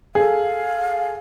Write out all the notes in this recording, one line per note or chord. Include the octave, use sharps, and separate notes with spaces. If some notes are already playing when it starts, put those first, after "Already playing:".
G#4 A4 F5